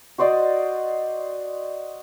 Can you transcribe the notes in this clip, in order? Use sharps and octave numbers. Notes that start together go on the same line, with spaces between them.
F#4 C5 D5 D#5